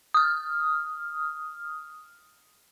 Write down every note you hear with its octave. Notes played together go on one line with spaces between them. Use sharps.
D#6 F6